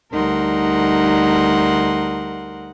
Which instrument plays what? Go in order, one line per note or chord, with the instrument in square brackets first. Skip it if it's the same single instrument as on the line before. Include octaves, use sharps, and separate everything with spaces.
[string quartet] D2 G3 D#4 A#4 F#5 C6